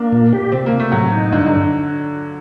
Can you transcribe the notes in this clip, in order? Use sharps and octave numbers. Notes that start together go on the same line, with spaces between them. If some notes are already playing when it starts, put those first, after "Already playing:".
Already playing: A#3 D4
A#2
G4
C3 C4
A#3
C3
A3
A2 F#3
D#4
G2 D3
D3